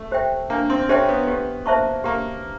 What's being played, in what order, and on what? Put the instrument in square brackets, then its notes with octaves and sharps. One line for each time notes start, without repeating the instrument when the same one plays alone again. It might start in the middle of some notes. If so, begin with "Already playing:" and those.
Already playing: [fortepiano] A3
[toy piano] G4 C5 E5 G5
[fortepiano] A#3 [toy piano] D4
[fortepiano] C4
[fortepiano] C#4 [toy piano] G4 C5 E5 G5
[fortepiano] B3
[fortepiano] B3 [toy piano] G4
[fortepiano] A#3 [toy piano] C5 E5 A5 C#6
[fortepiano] A#3 [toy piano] G4